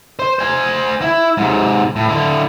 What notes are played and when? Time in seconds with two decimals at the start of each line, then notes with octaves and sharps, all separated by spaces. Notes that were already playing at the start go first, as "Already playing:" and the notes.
0.19 C5
0.39 C5 G#5
1.02 E4
1.37 G#2 C3
1.96 A2
2.09 D3 E4